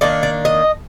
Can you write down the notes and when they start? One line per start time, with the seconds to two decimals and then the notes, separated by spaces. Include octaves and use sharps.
0.01 D#3 A#3 D4 D5
0.23 D5
0.45 D#5